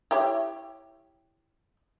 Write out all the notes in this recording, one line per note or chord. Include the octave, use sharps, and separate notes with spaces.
E4 G4 C#5